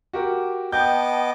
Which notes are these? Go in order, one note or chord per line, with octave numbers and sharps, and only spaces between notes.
F#4 G4 A#4
B3 D#5 G5 A5 D6 G6